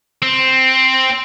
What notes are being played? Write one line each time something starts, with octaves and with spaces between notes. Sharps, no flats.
C4